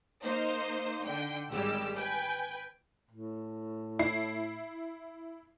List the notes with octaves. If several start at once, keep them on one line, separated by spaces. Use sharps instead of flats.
A#3 D#4 C5
D3 G5
G#1 G3 G#3 G4 E6
B4 G5 G#5
A2
E4 C7